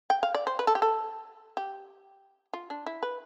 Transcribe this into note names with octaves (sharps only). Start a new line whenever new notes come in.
G5
F5
D5
C5
B4
A4
G4
A4
G4
F4
D4
E4
B4